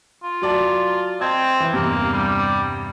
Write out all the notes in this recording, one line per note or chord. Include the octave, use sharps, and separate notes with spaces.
F4
F#3 D5 A5
C4 D#5 A5 G#6
E3
E2 G2 C3 A#3
G3